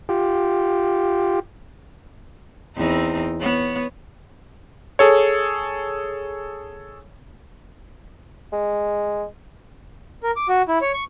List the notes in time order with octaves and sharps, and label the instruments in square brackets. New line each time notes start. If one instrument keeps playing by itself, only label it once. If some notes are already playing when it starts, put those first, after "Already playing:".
[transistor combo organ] F4 G4
[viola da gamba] E2 C4 D#4
B3 C#5
[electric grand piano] G#4 A4 C#5
[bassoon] G#3
[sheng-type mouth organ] A#4
D6
F#4
E4
C#5
C#6